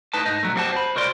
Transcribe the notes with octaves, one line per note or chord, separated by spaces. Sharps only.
A2 D#4 B4 A5
G#2 D#4
B2 F#3 A3
F#2 B3 C4 F#4 G4 A5
C5 B5
C#2 F#4 A#4 C5 D5 C6